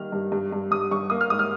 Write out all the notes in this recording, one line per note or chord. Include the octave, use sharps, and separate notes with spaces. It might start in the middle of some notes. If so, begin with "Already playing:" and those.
Already playing: D#3 G3 A#3 F6
G2
G2
G2
G2 D#6
G2 C#6
A#3 D#6
F6
G#2 D#6
F6